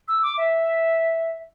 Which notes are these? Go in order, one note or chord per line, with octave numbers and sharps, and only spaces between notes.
E6
D6
E5